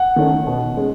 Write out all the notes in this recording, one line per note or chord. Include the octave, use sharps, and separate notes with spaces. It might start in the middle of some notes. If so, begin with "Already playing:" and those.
Already playing: F#5
D#3 A3 C#4
B2
G#3 C#4